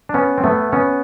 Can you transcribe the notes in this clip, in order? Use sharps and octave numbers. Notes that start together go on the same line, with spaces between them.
D4
B3 C#4
C4
A3 B3
B3 C#4